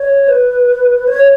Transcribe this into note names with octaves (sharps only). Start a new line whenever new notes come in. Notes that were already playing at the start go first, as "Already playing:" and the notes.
Already playing: C#5
B4
C#5